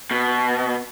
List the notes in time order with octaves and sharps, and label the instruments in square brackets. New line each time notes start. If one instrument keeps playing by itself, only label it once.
[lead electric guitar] B2